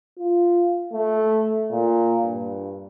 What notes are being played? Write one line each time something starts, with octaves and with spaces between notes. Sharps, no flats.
F4
A3
A#2
G2